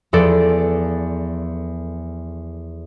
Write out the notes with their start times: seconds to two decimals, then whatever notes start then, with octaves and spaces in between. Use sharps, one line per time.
0.13 E2 F3 A4 D5